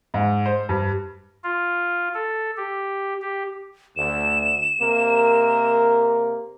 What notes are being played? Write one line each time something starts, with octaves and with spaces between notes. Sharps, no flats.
G#2
C5
G2
F4
A4
G4
G4
D2 E7
C3 A#3 A#4